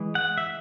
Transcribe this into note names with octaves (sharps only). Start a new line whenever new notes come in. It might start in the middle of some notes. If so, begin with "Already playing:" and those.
Already playing: E3 G#3 E4
F#5
E5